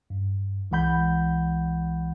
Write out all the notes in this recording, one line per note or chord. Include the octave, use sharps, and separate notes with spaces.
G2
C2 E3 G#3 F#5 B5 G6